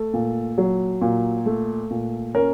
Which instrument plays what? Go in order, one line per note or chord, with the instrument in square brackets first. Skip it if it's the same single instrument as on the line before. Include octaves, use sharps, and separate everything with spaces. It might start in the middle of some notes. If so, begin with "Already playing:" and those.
Already playing: [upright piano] A3 A4
A#2
F#3
A#2
A3
A#2
C#4 A#4